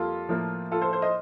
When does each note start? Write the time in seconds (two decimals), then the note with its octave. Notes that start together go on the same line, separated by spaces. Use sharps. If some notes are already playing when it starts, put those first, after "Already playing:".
Already playing: F2 G3 A#3 F4 A4
0.29 A2 F3 A#3
0.72 F4 A4
0.82 A4 C5
0.92 A4 C5
1.02 C5 D#5